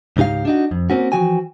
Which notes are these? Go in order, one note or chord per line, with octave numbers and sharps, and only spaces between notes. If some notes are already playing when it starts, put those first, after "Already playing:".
C#2 G#2 D#4 G4 F5
D4 D#4 F#4
F2
A#3 C4 C#4 F#4
E3 F3 F#4 G5 G#5